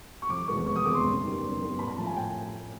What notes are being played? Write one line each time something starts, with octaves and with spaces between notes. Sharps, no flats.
C#6
F1 D6
E2 B2 G#3 B3 C#6
F1 C#6
D#6
E2 B2 G#3 B3 D6
C6
F#1
F#2 D#3 G3 B3
F#1
F#2 D#3 G3 B3
A2 B5
A#5
F3 A3 A5
G#5
A2 G5